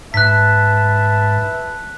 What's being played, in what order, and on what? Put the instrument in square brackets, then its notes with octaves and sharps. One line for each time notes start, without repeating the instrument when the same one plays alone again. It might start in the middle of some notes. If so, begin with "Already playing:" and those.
[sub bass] G#2 [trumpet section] B4 E5 A5 [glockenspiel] F#6 B6